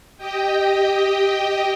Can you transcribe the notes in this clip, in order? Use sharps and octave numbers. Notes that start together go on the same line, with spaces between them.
G4 D#5 G5